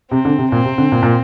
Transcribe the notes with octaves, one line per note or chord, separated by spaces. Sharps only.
C3 C4
D3
C3
A#2 C4
C3
D3
A#2
A#2